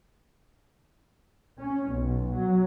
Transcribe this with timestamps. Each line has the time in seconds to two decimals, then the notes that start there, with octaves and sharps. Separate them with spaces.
1.58 C#4
1.90 B1
2.34 F#3